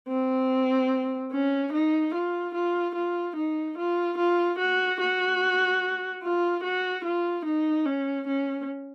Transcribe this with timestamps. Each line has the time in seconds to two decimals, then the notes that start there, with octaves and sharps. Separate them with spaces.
0.09 C4
1.32 C#4
1.73 D#4
2.14 F4
2.54 F4
2.95 F4
3.36 D#4
3.77 F4
4.18 F4
4.58 F#4
5.00 F#4
6.23 F4
6.64 F#4
7.04 F4
7.45 D#4
7.86 C#4
8.27 C#4